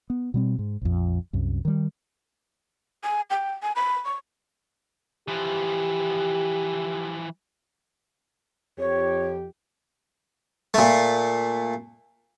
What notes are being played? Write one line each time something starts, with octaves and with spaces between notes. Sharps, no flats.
B3
B2 G3 C4
G#2
A#1 F2
C2 F#2
D#3 G3
G#5
G5
G#5
B5
C#6
E3 F3 G4
F2 G4 C#5
A#2 A3